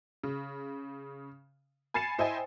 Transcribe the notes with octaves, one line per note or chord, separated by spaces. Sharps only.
C#3
G#5 B5 A6 C7 C#7 E7
E4 C5 D#5 E5 G5 G#5